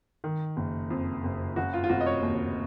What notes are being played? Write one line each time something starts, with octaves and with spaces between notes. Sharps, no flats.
D#3
F#1
F2
F#1
C#3 F#4
F4
F4
F1 F#4
D#5
C#5
D#2